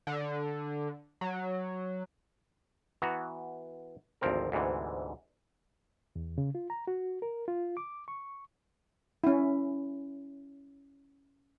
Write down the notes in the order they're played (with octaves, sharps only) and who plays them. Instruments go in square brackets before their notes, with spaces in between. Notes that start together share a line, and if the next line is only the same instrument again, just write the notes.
[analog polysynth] D3
F#3
[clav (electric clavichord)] E3 B3 F#4 A#5
G#1 D2 F3 C4 A#4
D2 G#2 C3 E3
[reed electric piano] E2
C#3
F4
A#5
F#4
A#4
F4
D6
C#6
[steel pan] C#4 E4